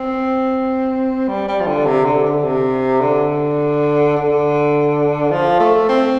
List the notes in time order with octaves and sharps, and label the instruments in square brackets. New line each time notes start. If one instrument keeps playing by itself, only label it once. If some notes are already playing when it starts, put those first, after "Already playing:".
Already playing: [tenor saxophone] C4
G3
G3
F3
D3
C3
D3
D3
C3
D3
D3
F3
A3
C4